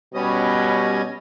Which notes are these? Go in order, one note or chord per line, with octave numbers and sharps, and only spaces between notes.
B2 G3 C#4 D#5